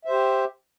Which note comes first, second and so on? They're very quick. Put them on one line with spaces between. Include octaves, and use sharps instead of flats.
E5 C5 G4